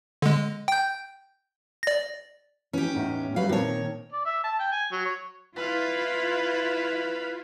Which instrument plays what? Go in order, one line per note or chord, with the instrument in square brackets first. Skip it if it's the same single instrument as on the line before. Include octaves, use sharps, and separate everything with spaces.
[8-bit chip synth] D3 G#3
G5 G6
D5 A#6
[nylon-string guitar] E3 [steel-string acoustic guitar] C#4 G4
[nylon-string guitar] E2 A2 D#4
[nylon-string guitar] F#3 G3 [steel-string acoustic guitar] B4 F5
[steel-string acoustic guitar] A#2 C#5 [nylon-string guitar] D#3 C4 A5
[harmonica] D5
E5
A5
G5
G#5
F#3
C#5
[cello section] E4 F4 [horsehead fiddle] B4 F5